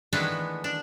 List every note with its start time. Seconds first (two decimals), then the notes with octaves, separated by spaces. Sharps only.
0.13 D#3 E3 G#3 A3 B3 D4
0.64 D4